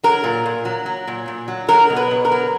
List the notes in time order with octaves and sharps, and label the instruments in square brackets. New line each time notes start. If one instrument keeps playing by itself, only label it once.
[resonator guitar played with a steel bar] F#3 A#4
A#2
A#2
F#3
F#3
A#2
A#2
F#3
F#3 A#4
B2
B4
B2
A#4
F#3